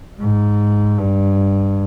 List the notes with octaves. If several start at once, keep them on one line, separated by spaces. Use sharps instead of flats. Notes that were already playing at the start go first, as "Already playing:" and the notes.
G#2
G2